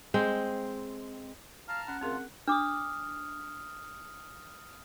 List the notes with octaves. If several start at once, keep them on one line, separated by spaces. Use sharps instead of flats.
G#3 C4 G5
F5 A5 A#5 F6
C#4 F#5
D2 C4 F4 G#4 A#4
D4 D6 D#6 F6